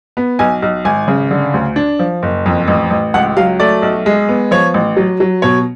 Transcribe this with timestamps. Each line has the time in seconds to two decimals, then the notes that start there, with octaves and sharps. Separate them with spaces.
0.17 B3
0.39 B1 G#5
0.62 B1
0.85 G#1 G#5
1.08 C#3
1.31 D3
1.54 D2
1.76 D4
1.99 F3
2.23 F#1
2.46 F2
2.68 A1
2.90 A1
3.14 C#2 F#5
3.37 F#3 F5
3.60 A3 D5
3.82 B1
4.06 G#3
4.29 B3
4.51 F3 C#5
4.74 A1
4.97 F#3
5.20 F#3
5.42 B2 C#5